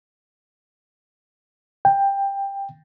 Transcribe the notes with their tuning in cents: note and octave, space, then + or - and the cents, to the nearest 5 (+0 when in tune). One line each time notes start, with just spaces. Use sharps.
G5 +15